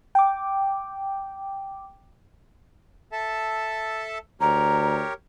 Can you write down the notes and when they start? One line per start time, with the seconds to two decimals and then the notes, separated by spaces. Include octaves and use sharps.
0.15 G5 D6
3.12 A4 E5 A5
4.41 D2 G4 A#4 C#5 A#5